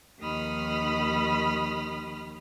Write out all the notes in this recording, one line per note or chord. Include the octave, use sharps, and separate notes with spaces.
D#2 D#3 F3 B5 D#6 F6